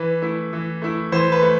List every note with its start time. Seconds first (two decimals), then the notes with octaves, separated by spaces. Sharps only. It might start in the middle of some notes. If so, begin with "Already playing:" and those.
Already playing: E3 B4
0.22 A3 E4
0.53 E3
0.82 A3 E4
1.12 E3 C5
1.32 B4
1.42 A3